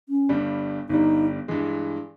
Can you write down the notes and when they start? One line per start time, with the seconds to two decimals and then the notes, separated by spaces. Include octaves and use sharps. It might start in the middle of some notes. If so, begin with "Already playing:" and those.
0.09 C#4
0.29 G1 G2 G3
0.89 G1 G2 G3 D#4
1.48 G2 E3 G#3